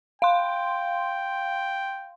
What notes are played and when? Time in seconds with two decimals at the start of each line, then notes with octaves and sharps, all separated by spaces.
0.22 F5 G5 C6